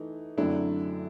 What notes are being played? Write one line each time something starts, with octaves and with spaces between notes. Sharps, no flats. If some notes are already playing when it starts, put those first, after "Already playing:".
Already playing: E3 A3 D#4
F#2 D3 F#3 A3 C4 D4 E4